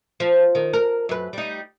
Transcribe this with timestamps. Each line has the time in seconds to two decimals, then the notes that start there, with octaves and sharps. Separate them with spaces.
0.20 F3
0.55 D#3
0.73 A#4
1.09 F#2 B4
1.33 G3 D#4